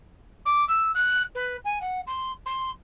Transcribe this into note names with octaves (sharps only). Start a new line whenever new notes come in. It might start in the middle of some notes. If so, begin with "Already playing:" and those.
D6
E6
F#6
B4
G#5
F#5
C6
C6